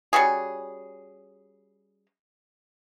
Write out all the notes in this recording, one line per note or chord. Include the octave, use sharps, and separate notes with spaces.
G3 C#4 F#4 G#4